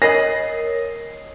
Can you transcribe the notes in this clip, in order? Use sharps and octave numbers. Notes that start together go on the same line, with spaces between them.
A#4 C#5 D#5 G#5 A#6 C7